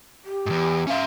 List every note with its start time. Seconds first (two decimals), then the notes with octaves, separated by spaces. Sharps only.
0.24 G4
0.46 E2 G#2
0.87 C#4 E5 F5